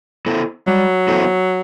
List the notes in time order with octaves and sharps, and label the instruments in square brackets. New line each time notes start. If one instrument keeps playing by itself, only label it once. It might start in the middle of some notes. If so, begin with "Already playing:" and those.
[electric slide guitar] B3 E4 A4 C5
[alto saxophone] F#3 [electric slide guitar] G3
[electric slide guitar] B3 E4 A4 C5